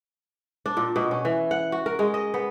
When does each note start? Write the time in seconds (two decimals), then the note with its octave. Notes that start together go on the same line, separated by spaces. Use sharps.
0.66 D4
0.77 A#2
0.96 B2
1.11 C#4
1.25 E3
1.51 F#5
1.72 F#4
1.86 A#4
1.99 G#3
2.14 D#5
2.34 B3